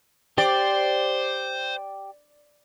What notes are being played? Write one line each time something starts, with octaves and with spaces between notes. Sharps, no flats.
G4 C5 D5